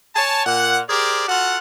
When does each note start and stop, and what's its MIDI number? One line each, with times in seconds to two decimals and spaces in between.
0.15 0.44 73
0.15 0.44 80
0.15 0.44 81
0.45 0.80 46
0.45 0.80 78
0.89 1.27 67
0.89 1.27 68
0.89 1.27 70
0.89 1.27 72
0.89 1.27 74
1.28 1.58 65
1.28 1.58 66
1.28 1.58 69
1.28 1.58 78